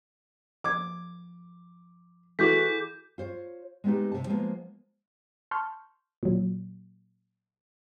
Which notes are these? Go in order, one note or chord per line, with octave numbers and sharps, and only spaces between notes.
F3 D6 G#6
E3 E4 F#4 G#4 A4 D6 G6 B6
F4 C5 C#5
G#3 A3 B3 C4 D#4 G4
C3 A5
F3 G#3 A#3 B3 D#4 F4
A5 C6 C#6 F6 G6
A#2 F#3